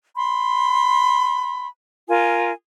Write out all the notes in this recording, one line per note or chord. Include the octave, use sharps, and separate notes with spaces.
B5 C6
F4 A#4 G#5